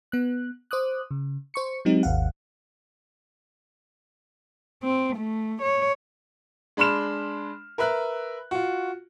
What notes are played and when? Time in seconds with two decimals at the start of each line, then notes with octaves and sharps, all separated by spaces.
0.12 B3 F#6
0.71 C5 D6 D#6 F#6
1.11 C#3
1.54 C5 C#6 C#7
1.85 F#3 G#3 C4 D#4 G4
2.03 G#1 D#2 F5 F#5
4.83 C4
5.16 A3
5.62 C#5
6.77 G#3 D4 B5 C6 F6 E7
7.78 A#4 B4 E5 F#6
8.51 F4 F#4